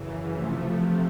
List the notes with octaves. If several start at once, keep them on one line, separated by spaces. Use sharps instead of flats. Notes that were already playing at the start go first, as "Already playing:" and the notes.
Already playing: F#2 C#3 E3
C3 F3 A3